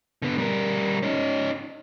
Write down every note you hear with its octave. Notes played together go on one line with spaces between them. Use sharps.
D3 B3
G3 A#4
C#4 D#4